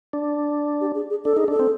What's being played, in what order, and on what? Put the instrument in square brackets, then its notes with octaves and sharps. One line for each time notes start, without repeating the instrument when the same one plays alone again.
[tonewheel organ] D4
[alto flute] G4
G#4
G#4
[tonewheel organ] D4 [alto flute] A4
[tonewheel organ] D#4 [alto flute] G#4
[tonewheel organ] D4 [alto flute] A4
[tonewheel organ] C4